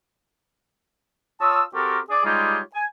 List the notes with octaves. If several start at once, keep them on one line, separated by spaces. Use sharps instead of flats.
F4 C#5 A5 D#6 E6
C4 F#4 G4 A4 A#4
G#4 D5
G3 G#3 D#4 F4 G4 C#5
G#5